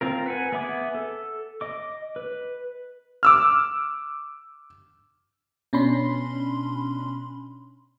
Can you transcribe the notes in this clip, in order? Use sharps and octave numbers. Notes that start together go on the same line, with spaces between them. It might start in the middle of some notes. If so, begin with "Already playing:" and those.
C4 F4 A#4
B4 F#5 G#5
B3 G#4 E5 B5 D6
A4
D#5 D6
B4
D6 E6 F6
B2 C#4 D4 B5 C6